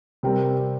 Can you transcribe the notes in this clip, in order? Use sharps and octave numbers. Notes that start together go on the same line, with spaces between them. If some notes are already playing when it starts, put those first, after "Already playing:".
C3 G3 C4 G4 A#4